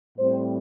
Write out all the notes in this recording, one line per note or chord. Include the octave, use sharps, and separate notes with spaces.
A2 G3 C4 C5